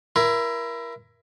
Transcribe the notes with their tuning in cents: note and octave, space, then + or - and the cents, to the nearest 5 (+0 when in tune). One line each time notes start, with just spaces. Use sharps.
E4 +25 A#4 +25